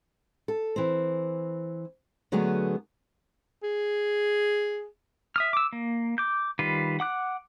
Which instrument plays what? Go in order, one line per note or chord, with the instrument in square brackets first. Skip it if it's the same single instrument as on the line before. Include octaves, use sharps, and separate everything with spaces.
[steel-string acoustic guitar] A4
E3 C4
D3 F#3 A3 B3 G#4
[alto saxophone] G#4
[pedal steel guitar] E5 D#6 F6
D6 E6
A#3
D6 G6
D#3 G3 F4 B4
F#5 D6 F#6